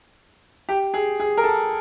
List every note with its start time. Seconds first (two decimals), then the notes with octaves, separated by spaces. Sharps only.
0.69 G4
0.94 G#4
1.20 G#4
1.37 A#4
1.44 A4